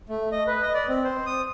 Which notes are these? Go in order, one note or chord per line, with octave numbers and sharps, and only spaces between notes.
A3
D#5
B4
D#5
D5
C4
C5
D#6